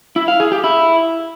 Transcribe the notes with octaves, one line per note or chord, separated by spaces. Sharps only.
E4
F5
G#4
G4
E4